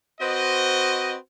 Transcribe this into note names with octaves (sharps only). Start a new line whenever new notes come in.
C4 F#4 B4 C5 D#5